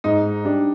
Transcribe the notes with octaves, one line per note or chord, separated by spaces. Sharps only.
G#2 D#4
G3 D4